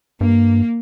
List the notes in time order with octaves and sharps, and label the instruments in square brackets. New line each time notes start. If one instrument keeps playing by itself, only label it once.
[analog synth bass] G2 [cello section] A#3